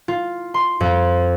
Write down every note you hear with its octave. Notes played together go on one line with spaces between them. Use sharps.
F4
C6
F2